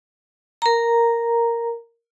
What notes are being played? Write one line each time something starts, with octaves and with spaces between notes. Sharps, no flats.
A#4 A#5